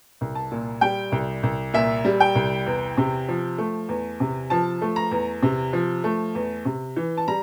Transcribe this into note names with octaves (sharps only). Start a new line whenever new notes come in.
C2
A5
A#2
G3 G5
C2
C2
A#2 E5
G3
G5
C2
E2
C3
F3
A3
E2
C3
F3 A5
A3
A#5
E2
C3
F3
A3
E2
C3
E3
A5
G3 A#5